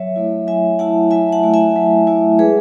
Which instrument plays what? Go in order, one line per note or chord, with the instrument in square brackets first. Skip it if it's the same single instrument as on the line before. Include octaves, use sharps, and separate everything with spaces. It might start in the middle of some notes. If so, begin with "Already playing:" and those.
Already playing: [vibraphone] F#3 C#5 E5
A3 E4
F#3 E5 G#5
A3 E4 F#5 A5
F#3 E5 G#5
F#5 A5
A3 E4
E5 G#5
F#3
A3 E4
G#3 G#4 B4